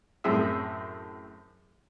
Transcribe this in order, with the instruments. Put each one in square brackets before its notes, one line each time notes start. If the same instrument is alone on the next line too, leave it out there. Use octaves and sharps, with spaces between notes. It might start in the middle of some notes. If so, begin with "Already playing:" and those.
[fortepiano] F#2 A2 C4 G#4 E5 E6